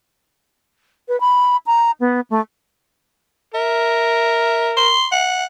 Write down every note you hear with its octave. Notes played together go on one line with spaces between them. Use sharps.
B4
B5
A#5
B3
A3
A#4 E5
C6
F#5